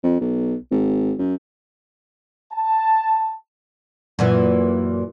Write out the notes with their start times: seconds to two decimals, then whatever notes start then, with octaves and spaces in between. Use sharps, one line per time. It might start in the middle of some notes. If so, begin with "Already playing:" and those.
0.03 F2
0.20 B1
0.71 G#1
1.18 F#2
2.52 A5
4.19 F#2 A#2 E3